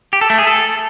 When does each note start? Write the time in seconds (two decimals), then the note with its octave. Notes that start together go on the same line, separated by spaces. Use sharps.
0.13 G4
0.21 A4
0.30 A3
0.39 G#4
0.47 A4